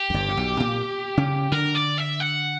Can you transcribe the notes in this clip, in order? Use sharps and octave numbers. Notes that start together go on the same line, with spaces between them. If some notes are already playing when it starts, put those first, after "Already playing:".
Already playing: G4
F#2
G1 G2
A#2
B1 B2
A#2 A#3
C#3 C#4
D3 D4 A#4
D5
E5
F#5